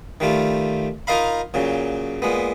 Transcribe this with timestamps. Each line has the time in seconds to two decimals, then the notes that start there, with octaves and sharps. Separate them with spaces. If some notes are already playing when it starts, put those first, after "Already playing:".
0.20 D#3 G3 A3 F4
1.07 D#4 F4 A#4 D#5 F5 B5
1.54 A#2 C#3 F#3
2.22 A#2 G#3 B3